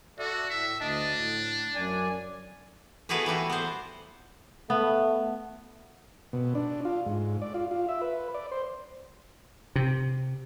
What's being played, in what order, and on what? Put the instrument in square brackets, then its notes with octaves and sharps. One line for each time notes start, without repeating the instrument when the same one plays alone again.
[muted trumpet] F#4 [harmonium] A4 D5 E5
[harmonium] A2 [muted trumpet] E5
[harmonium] D2 D#5 A5 [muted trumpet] D4
[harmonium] A2
F#2 D5 G#5
[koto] A3 B3 E4 F#4 G#4 B4
E3 G3 E4 F#4
B3 C5
[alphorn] A3 [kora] B3
[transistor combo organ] B2
D4
F4
G#2
D5
F4
F4
E5
B4
D5
C5
[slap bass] C3